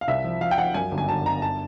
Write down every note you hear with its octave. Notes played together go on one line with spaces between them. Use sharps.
F5
C2 E5
F3
F3 F5
G5
F3 F#5
F#2 G#5
G1
G#5
G1 A5
G1 A#5
A5